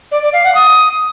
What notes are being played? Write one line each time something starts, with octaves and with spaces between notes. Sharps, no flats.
D5
D5
F5
F#5
D#6